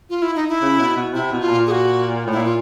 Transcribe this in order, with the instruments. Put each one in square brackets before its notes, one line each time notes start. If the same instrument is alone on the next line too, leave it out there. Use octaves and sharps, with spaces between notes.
[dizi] F4
E4
D#4
E4
[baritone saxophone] C#3
B2
B2
[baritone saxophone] C3 [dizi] E4
[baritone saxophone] B2
[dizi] F4
[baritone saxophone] A#2
[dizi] G#4
F#4
[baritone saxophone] A2
[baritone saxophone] A#2 [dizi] E4
[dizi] F4